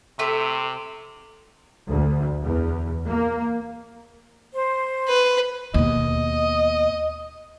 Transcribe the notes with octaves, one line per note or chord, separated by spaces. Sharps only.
C3 A3 E5
D2
E2
A#3
C5
B4
D#2 B2 D#5